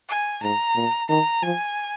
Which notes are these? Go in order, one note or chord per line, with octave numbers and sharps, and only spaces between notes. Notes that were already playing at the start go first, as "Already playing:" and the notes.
G#5
G#2 A#5
A#2
D#3 A#5
F3 G#5